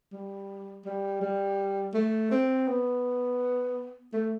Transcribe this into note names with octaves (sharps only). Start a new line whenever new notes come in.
G3
G3
G3
A3
C4
B3
A3